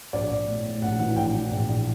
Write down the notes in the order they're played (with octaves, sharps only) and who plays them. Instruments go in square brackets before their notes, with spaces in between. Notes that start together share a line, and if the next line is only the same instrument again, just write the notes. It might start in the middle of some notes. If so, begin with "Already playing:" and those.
[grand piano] A#1 D5
A#1
A2
A2
A#1 F#5
E3 F#5
A#1 G5
E3
A#1
A#1